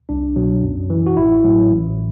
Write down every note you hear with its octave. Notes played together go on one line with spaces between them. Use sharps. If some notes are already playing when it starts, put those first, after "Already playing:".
C2 D4
B2 F#3
F#2
E3
F#4
A1 E4
A2 F#3
A1